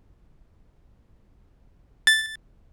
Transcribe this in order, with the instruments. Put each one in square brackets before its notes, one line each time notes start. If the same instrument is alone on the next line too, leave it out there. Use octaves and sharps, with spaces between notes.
[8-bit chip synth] A6